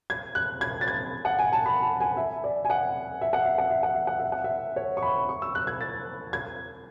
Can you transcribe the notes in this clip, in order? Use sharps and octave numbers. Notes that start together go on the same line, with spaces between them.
G#6
F#6
G#6
A6
G#6
F#5
G#5
A5
B5
A5
G#5
E5
D5
G#5
F#5
E5
F#5
E5
F#5
E5
F#5
E5
F#5
E5
F#5
E5
C#5
C#6
B5
C#6
E6
F#6
G#6
A6
G#6